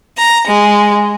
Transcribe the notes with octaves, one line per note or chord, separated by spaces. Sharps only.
A#5
G#3